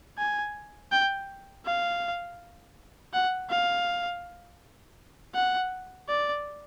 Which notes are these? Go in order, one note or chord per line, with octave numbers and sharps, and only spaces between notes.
G#5
G5
F5
F#5
F5
F#5
D5